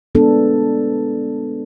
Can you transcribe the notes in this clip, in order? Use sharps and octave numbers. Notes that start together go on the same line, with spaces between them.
G#3 B3 D4 A4